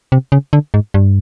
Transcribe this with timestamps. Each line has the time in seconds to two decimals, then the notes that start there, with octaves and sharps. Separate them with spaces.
0.12 C3
0.32 C#3
0.53 D3
0.74 G#2
0.94 G2